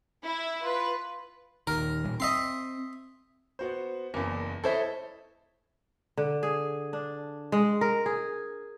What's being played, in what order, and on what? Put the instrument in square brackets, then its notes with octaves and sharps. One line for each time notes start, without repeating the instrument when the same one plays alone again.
[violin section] E4 E5
[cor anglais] F4 [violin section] B4
[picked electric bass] D#1 D#2 D#3 [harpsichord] A#4
[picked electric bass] D#2 A#2 G3
[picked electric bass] C4 [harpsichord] D#5 E5 C6
[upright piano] B3 F#4 C5
[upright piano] F#1 E2 [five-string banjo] A#3
[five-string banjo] E4 C5 E5 [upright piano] A4 C#5 D#5
[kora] D3
G#4
D4
G#3
A#4
G#4